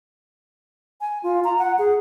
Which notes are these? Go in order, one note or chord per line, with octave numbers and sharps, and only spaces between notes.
G#5
F4
A#5
F#5
G#4